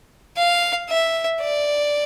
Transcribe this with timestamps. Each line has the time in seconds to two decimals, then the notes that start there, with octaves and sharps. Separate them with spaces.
0.37 F5
0.89 E5
1.41 D5